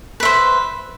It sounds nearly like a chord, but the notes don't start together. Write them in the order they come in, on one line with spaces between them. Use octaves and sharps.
B4 E5 C5